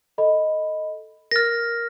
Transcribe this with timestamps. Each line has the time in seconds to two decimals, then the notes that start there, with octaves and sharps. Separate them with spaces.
0.18 A4 D#5 B5
1.31 A#4 F6 A6 A#6